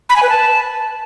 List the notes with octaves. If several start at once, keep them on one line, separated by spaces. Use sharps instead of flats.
B5
G#5
B4
A5